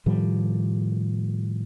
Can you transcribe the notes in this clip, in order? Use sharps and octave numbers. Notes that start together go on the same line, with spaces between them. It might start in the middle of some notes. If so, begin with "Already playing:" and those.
A2 D#3 F3 G3